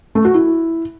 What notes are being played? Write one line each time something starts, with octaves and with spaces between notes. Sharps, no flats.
A3
F#4
E4